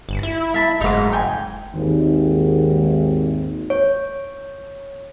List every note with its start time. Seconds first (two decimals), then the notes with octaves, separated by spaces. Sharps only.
0.09 G1
0.23 E4
0.54 E5 A5 B5
0.81 F#1 G#2 D#4
1.13 G5 G#5
1.75 G#1 D#2
3.70 C#5